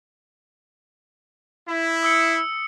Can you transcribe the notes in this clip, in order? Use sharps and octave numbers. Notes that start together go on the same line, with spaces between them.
E4
D#6 E6 C#7